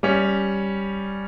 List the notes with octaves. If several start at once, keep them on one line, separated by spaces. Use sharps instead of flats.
G3 C#4